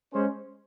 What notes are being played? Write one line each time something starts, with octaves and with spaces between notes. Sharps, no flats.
G#3 C#4 G#4 C5